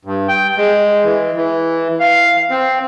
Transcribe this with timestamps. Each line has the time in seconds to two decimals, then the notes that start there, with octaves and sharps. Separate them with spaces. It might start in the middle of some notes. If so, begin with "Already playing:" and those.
0.05 G2
0.28 G5
0.57 G#3
1.04 E3
1.36 E3
2.00 F5
2.50 C4